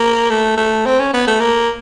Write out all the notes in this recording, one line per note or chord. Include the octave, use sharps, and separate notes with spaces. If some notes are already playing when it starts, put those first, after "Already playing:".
Already playing: A#3
A3
A3
C4
C#4
B3
A3
A#3